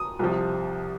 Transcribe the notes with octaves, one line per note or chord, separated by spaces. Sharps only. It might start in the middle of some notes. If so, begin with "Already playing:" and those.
Already playing: D#6
C2 C3 F3